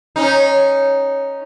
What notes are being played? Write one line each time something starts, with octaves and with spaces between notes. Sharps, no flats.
C#4 D#4